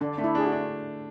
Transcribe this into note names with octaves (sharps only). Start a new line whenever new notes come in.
D3 D4
A3 D4
E4
D4 G#4
F#4
D4